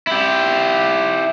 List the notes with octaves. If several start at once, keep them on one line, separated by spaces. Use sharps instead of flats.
E4 G4